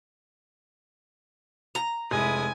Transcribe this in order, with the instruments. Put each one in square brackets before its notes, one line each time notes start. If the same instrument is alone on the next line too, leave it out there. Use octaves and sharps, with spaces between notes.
[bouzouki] A#5
[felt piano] F1 G#3 [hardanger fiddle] E4 D#6 [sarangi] G#5